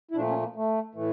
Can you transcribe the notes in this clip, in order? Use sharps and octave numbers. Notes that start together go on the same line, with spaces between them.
E4
A#2 F3 A3 D4
C#4
A#3
A3
A2 E3 A3